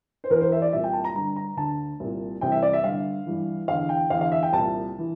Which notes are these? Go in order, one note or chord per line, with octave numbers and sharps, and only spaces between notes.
C5
E2 E3 A#4
C5
E5
D5
C2 A#2 E5
G5
A5
A#5
G2 D3 A#5
A#5
D2 D3 A5
C2 A#2
C2 C3 E3 G5
E5
D5
E5
G2 D3 F5
G2 E3
E2 D3 F5
G5
E2 D3 F5
F5
E5
G5
C2 A#2 A5
E3